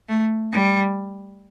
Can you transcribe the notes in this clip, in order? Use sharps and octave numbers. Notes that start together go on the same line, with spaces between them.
A3
G3